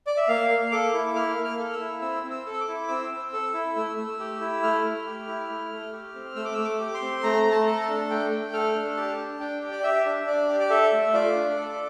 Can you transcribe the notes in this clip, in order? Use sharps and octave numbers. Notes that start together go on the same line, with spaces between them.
D5
E5
A#3 F5
A#3
A4 D6
E4
A#3 F6
A#3
F6
A4
E6
E4
C4 E6
C4
E6
A4
E6
D6
E4
C4 E6
C4
A4
E4
A3
A3
G4
E4
A3 F6
A3
G4
E4
A3
A3
G4
C4
A3 E6
D6
A3 E6
D6
G4
C6
C4
A3 A#5
A3
A5
A4
A#5
A5
D4
A3 G5
A3
A4 F6
D4
G4 A5
D4
D4 G5
G4
D5
G4 E5
D4
D4 D5
G4
D5
A4 E5
A3
F4 D5
D4
A4